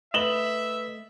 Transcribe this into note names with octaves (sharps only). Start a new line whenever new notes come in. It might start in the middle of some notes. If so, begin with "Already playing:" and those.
A3 B4 D#5 E5 E7 F#7 G7